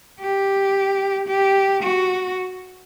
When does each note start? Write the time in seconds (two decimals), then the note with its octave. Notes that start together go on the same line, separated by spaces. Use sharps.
0.20 G4
1.28 G4
1.83 F#4